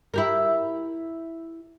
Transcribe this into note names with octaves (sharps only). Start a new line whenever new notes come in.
E4 G4 A#4